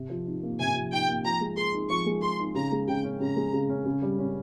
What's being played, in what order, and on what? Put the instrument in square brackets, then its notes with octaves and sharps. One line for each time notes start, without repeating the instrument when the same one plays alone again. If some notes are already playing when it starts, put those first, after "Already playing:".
Already playing: [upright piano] C3
F3
D#4
A#3
[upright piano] C3 [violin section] G#5
[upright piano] F3
[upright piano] D#4 [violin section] G5
[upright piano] A#3
[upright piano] F3 [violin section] A#5
[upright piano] G#3
[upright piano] G#4 [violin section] C6
[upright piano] D#4
[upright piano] F3 [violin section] C#6
[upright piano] G#3
[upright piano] G#4 [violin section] C6
[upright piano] D#4
[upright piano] C#3 [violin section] A#5
[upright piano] G#3
[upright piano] C#3 [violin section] G5
[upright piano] C#4
[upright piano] C#3 [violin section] A#5
[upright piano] G#3
C#3
C#4
C#3
G3
C#4